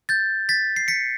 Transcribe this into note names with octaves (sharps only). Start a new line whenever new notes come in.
G6 A6
A6 B6
C7
B6 C#7